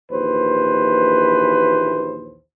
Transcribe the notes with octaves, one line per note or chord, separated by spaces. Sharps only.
A#1 D#2 E3 B4 C5